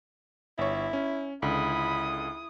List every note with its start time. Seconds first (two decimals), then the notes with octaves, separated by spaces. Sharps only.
0.58 G1 E4 C#5
0.93 C#4
1.42 C#2 D3 E4 B5 D#6